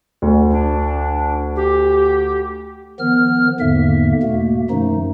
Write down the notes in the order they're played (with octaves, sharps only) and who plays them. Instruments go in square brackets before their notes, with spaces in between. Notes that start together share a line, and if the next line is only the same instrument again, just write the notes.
[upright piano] D2
[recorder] D4
G4
[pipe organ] D#3 F3 B3 F6
E2 G#2 D3 A#3 E5
B2 A3 A#3
F#2 D#3 F3 A3 D#4